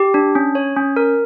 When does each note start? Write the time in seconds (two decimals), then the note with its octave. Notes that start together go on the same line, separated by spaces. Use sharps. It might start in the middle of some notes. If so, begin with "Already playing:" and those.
Already playing: G4
0.14 D4
0.35 C#4
0.55 C#5
0.76 C#4
0.96 A#4